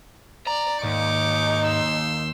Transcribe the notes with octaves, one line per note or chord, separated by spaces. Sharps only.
D5 A#5
D#2 G#2 D#4 C#6 D6
C6 E6